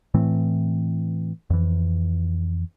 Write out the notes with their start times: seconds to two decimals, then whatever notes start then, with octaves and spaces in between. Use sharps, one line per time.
0.14 A2 E3 A3 C4
1.50 F2 E3